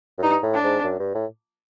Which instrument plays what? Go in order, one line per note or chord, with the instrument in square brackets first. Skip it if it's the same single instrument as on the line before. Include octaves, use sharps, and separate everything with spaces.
[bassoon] F#2
[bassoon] G2 [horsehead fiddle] D#4
[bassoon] A2
[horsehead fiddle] D4
[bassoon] G#2
F#2
G2
A2